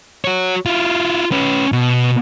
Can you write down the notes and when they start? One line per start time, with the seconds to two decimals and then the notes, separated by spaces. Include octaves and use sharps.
0.25 F#4 C#5
0.66 E4 F4
1.32 C#4 B4
1.72 B2